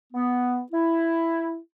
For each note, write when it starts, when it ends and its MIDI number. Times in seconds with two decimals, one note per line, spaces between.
0.13 0.61 59
0.71 1.57 64